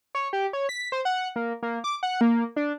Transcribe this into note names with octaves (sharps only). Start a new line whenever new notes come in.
C#5
G4
C#5
B6
C5
F#5
A#3
A#3
D6
F#5
A#3
D4